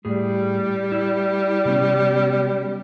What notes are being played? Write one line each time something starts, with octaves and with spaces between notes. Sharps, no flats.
A2 G3 G#4
E4
C3 B3 C#4